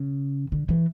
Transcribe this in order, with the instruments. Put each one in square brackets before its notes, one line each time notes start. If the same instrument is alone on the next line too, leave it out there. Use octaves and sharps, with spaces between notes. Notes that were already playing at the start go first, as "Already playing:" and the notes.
Already playing: [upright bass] C#3
D3
E3